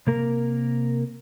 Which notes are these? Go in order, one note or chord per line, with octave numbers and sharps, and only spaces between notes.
C3 A#3 A#4